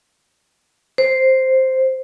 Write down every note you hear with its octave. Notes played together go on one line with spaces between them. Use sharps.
C5